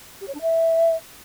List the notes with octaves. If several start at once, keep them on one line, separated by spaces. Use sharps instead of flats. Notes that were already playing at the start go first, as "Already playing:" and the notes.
G4
C#5
D4
E5